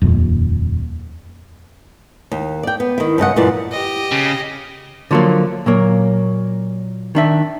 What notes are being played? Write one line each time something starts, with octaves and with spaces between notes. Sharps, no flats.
D#1 F2
D#2
D5 G5
B3
D#3 E4
G2 C#3 D#5 F#5
F#2 A#2 E3 D5
G4 D#5
C#3
D3 F3 F#3 A3 A#3
A#2 F#3 A#3
D#3 D4 E5